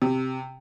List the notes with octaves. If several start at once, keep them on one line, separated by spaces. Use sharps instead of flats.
C3